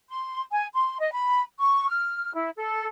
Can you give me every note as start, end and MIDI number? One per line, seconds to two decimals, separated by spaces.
0.10 0.41 84
0.51 0.66 80
0.74 0.98 84
1.00 1.10 75
1.12 1.41 83
1.60 1.88 85
1.89 2.32 89
2.34 2.50 64
2.57 2.86 69